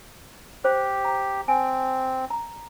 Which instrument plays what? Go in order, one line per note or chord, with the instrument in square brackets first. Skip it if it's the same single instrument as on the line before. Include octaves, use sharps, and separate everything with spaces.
[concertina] G4 [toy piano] C5
[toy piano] A#5
[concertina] C4 [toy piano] G#5
[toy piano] A#5